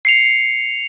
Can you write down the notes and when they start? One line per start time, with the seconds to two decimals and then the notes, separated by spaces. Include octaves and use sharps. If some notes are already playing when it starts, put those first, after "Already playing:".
0.05 C7 C#7 F7